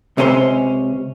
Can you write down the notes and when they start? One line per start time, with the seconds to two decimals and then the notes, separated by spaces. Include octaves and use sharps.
0.17 C#2 C3 C#4 G#4 C5 C6